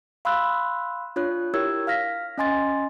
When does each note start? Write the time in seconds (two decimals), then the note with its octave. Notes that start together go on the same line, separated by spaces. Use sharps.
0.25 F5 B5 C6 E6 F#6
1.16 D4 F4 C#5 F#6
1.54 E4 G4 A#4 C#5 E6 G#6
1.87 F5 F6 A#6 B6
2.38 C#4 D#5 G#5 C6 A6